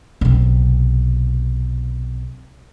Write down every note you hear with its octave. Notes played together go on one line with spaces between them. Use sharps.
B1 C3